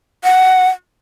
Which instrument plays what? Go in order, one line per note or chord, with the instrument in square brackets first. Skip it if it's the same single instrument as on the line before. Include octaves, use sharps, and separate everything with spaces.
[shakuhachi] F#5